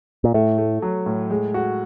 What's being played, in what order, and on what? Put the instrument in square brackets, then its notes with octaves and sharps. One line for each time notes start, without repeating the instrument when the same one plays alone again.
[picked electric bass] A#2
[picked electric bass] A2 [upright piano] A3
[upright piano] A3
F#3
A2
G#3
F#4